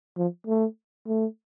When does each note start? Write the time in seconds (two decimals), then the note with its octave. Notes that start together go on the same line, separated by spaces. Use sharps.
0.18 F3
0.47 A3
1.08 A3